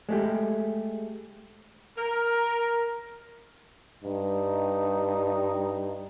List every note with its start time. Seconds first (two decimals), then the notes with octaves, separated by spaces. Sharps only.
0.09 G#3 A3 G4
1.97 A#4
4.04 G2 D#4